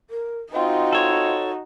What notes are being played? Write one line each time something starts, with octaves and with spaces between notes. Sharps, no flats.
A#4
C4 D#4 F4 F#4 D#5
A4 C#5